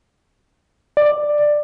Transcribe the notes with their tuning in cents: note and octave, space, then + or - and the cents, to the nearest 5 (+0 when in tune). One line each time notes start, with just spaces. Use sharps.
D5 +10